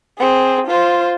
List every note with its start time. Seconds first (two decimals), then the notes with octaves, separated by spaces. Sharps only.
0.19 C4 G#4
0.67 F4 C5